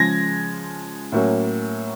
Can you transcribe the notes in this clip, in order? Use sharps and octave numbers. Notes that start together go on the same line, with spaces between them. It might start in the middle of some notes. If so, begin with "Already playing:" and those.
Already playing: C#3 F3 G#3 G#6 A#6
A2 F#3 A#3 C#4